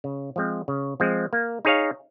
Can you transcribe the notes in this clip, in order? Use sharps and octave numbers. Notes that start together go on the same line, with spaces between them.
C#3
F3 G#3 C4
C#3
F3 G#3 C4
A#3
D#4 G#4 C#5 F5